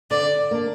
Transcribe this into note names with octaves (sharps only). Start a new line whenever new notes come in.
D3 D5
A#3 D4